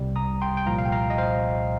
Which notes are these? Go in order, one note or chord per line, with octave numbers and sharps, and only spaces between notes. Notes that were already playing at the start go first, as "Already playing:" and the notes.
Already playing: C2 C3 G3
A#5 D#6
G5 C6
G5
C2 A#2 F3 F5 A#5
F5
G5
F5 A#5
D#5
C5 F5